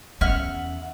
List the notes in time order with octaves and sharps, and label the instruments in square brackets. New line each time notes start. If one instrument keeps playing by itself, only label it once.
[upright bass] E2 C#4 [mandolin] E5 F#5 F6